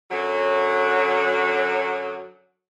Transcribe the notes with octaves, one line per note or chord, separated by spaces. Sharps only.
F#2 D3 F#3